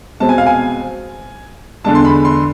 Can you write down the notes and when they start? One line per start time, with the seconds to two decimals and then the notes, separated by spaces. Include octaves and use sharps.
0.20 B2 G#3 C4 A5
0.29 G#5
0.38 F5
0.47 G#5
1.84 E2 D3 G#3 D4 A5
1.95 C6
2.05 B5
2.25 C6